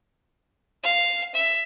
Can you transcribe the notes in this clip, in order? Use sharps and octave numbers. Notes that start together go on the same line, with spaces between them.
F5
E5